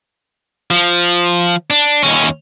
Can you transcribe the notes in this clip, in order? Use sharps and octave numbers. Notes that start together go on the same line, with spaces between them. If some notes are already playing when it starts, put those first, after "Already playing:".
F3
D4
D#2 C#4